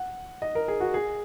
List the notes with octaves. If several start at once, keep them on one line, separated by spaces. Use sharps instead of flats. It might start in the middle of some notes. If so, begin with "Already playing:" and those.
Already playing: F#5
D#5
A#4
G#4
F#4
G#4